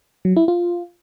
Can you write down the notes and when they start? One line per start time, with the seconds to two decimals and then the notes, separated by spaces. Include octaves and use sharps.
0.25 F#3
0.36 E4
0.48 F4